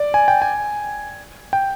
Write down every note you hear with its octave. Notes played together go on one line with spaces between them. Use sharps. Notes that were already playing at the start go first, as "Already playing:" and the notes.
Already playing: D5
G#5
G5
G#5
G5